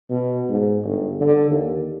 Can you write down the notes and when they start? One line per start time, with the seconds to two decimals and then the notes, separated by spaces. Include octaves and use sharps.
0.10 B2
0.49 G#2
0.84 G1
1.20 D3
1.50 D#2